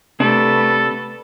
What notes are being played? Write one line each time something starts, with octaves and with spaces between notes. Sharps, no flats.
C3 A3 B3 D4 A4